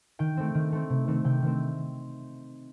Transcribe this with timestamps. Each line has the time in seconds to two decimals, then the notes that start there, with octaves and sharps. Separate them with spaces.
0.19 D#3 G5
0.37 A3 C4
0.55 D#3
0.72 A3 C4
0.90 C3
1.07 D#3 A3 C4
1.24 C3 G5
1.42 D#3 A3 C4